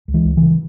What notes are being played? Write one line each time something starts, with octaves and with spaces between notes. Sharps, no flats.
C#2
E3 G#3
C#2
E3
C#3